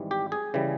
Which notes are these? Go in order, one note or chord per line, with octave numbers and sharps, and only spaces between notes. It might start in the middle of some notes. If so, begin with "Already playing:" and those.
Already playing: G#1 G#2 E3 G3
G4
G#4
C#3 E3 G3